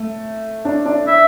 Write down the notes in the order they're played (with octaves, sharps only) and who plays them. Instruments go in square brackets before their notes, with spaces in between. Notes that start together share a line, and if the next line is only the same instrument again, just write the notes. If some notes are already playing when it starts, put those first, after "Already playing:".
Already playing: [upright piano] A3
D4 D5
D4 D5
[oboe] E5